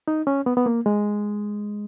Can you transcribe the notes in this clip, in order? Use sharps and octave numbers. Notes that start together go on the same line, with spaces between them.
D#4
C#4
B3
B3
A#3
G#3